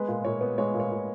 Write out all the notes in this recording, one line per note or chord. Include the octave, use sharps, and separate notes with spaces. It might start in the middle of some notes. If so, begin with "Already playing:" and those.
Already playing: G#3 B3 B4
A#2
A#2 C#5
B3
G#3 C#5
A#2
C#5
A#2